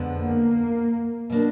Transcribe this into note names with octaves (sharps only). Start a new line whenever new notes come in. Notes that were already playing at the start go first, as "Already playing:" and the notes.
Already playing: F2 D3 F3 G#3 B3
A#3
B2 A#3 D4